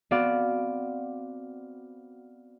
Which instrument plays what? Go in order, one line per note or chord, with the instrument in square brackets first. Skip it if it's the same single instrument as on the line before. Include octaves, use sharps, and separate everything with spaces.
[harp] B3 C4 F#4 D5 F5